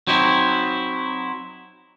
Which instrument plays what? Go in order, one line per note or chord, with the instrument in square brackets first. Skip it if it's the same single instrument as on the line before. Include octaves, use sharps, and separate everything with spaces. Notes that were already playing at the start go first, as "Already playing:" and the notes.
[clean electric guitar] F#3 C4 D#4 E4